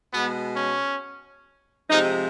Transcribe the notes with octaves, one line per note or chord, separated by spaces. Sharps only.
B2 G#3 B3
C#4
C3 F3 G#3 D#4